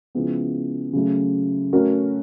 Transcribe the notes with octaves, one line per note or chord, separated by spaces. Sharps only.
C#3 F3 G#3 B3 E4
C#3 F#3 A3
A3 C#4 F#4 A#4